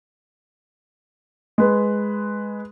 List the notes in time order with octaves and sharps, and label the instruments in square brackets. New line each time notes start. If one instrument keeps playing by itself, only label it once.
[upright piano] G#3 B4